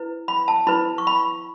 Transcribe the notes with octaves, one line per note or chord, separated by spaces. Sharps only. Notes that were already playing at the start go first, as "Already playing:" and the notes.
Already playing: E4 B4
B5
A5
E4 B4 B5
C#6
B5